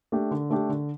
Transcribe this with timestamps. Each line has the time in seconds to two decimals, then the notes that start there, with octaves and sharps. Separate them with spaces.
0.12 A3 D4 G4
0.31 D3
0.50 A3 D4 G4
0.69 D3